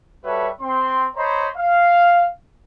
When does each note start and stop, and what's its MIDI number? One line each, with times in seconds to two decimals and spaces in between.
0.25 0.49 55
0.25 0.49 66
0.25 0.49 69
0.25 0.49 71
0.25 0.49 73
0.25 0.49 76
0.61 1.07 60
0.61 1.07 84
1.17 1.49 72
1.17 1.49 73
1.17 1.49 75
1.17 1.49 82
1.17 1.49 83
1.57 2.27 77